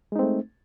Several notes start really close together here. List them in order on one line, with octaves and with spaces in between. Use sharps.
G#3 D#4 C4 A3